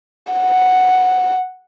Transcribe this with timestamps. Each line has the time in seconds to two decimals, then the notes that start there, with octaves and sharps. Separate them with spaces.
0.33 F#5